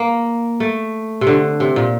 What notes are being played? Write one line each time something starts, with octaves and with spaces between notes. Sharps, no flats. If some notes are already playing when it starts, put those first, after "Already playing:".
Already playing: A#3
A3
C3
D3
C3
A#2